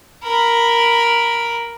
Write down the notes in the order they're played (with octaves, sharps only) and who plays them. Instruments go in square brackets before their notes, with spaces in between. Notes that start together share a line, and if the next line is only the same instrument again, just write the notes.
[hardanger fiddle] A#4 B5